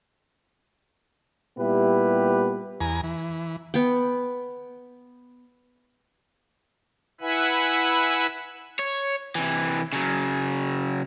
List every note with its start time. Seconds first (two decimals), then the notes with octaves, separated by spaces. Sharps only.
1.58 A#2 G3 B3 E4 G4 B4
2.81 E2 G#5 A#5
3.04 E3
3.74 B3 G5
7.21 E4 B4 E5 F#5 G#5 B5
8.79 C#5
9.35 C3 E3
9.93 C#3 F#3